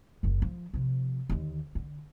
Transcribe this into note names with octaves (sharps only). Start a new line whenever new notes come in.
F#1 D#2
F3
C3 F3
D#2 D3
D3